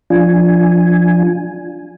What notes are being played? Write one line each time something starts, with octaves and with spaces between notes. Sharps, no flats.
F3 D4 F4 G#5